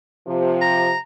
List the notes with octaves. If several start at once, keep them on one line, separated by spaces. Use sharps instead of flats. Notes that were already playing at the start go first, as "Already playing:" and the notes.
C3 F3
A#5